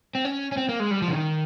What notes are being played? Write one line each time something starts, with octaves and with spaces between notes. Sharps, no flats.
C4
C#4
C#4
C4
A#3
G#3
G3
F3
C#3
D#3